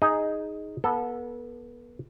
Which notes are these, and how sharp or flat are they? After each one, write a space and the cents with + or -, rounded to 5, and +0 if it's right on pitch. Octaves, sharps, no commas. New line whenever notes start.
D#4 +0 G#4 +0 D#5 -5
B3 -30 A4 +0